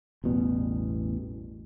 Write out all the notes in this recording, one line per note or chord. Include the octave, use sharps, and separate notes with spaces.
A1 E2 B2 G3